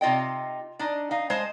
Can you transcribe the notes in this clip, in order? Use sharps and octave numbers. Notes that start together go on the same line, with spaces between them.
C3 D#4 F4 D#5 G5
D4 D#4
D#4 F5
G#3 C5 D#5 A5